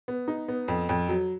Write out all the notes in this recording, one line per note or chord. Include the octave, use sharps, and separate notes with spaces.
B3
D#4
B3
F2
F2
F#3